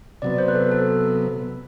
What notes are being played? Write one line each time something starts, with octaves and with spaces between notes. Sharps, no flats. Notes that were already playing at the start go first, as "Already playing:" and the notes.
C3 F#3 B3 D5
C5
B4
A4
A4